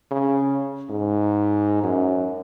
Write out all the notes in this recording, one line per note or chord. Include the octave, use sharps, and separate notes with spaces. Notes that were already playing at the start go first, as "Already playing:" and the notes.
C#3
G#2
F#2